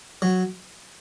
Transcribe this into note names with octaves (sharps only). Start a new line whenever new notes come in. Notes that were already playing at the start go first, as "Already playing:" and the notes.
F#3